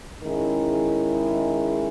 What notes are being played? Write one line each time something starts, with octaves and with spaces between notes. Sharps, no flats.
D#3 G#3 C#4 E4 G#4